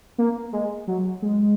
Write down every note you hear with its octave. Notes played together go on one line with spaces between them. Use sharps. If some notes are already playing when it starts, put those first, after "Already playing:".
A#3
G#3
F#3
G#3